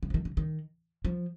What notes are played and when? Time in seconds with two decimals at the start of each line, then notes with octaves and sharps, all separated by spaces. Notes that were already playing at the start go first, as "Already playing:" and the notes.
0.03 D3
0.10 F3
0.14 D#3
0.25 D3
0.37 D#3
1.05 F3